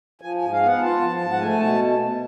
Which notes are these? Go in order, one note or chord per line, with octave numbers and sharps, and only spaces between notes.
F3 G#5
G#5
G#2
F5
B3 F#5
F4 A5
F3
G#2
F#5
A3 G#5
B2 A5